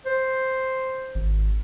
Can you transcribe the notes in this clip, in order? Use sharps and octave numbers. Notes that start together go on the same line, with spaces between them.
C5
G#1